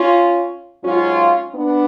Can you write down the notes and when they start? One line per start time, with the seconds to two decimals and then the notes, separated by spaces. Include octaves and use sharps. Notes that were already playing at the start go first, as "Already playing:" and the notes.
Already playing: C#4 F4
0.83 G#2 F#3 C#4 F4
1.53 B3 D4